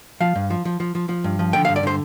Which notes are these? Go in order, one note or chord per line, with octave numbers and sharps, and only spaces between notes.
F3 F5
G2
F3
F3
F3
F3
F3
G2
F3
D3 G5
F5
G2
D5
D3 C5